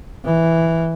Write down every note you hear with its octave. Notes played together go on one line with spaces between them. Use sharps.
E3